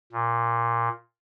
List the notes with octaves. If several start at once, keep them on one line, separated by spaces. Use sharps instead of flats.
A#2